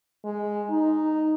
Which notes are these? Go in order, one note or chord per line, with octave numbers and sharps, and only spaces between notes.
G#3
D#4